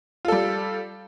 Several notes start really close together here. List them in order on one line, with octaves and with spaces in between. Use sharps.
F4 A4 G3